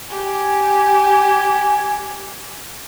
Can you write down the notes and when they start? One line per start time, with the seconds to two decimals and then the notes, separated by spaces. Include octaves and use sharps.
0.10 G4 G#5